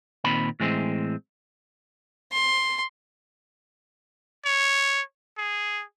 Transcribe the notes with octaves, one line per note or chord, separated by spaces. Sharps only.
A#2 D#3 C4 B5
A2 E3 G#3 C4
C6
C#5
G#4